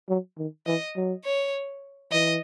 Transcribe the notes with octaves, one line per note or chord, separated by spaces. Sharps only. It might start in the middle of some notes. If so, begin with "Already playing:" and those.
F#3
D#3
E3 D#5
F#3
C#5
E3 D#5